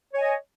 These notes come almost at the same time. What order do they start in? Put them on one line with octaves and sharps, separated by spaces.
C#5 G#5 D#5